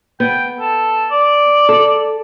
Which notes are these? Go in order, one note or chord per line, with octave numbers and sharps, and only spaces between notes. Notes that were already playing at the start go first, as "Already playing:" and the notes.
B3 G5
A4
D5
A4